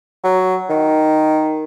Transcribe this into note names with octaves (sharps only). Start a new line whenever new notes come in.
F#3
D#3